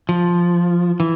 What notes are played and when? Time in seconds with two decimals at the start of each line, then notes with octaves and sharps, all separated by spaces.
0.09 F3
1.00 E3